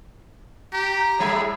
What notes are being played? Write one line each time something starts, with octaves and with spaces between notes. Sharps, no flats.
G4 A#5
A2 G3 G#4 E5